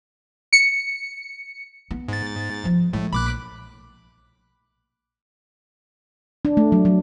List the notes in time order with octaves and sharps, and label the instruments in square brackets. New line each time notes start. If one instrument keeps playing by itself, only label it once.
[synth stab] C#7
[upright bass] B3
[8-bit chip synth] G#2 A6
[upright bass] F3
[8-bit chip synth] A2 [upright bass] G#3 A3
[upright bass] A#1 [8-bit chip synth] B5 D6 F#6
[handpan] D4
A3
F#3
F#3